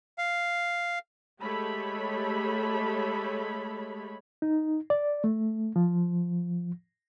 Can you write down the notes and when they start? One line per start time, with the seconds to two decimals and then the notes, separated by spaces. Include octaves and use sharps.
0.18 F5
1.41 G#3 A3 G4 A4 C#5 B5
4.42 D#4
4.90 D5
5.24 A3
5.76 F3